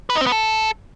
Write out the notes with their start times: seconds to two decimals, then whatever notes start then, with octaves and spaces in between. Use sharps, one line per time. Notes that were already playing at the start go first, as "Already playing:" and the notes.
0.10 B4
0.15 D#4
0.21 C4
0.26 B3
0.32 A4